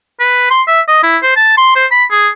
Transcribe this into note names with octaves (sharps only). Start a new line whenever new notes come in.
B4
C6
E5
D#5
E4
C5
A5
C6
C5
B5
G#4